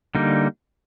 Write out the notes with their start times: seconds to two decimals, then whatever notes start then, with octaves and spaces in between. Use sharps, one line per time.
0.15 D3 G3 A#3 D#4